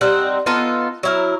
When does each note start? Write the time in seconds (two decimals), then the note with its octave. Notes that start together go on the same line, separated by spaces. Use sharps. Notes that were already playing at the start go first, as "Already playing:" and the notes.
0.01 G3 C4 D#4 F#5
0.46 B3 D#4 F4 A4
1.03 F#3 E4 A#4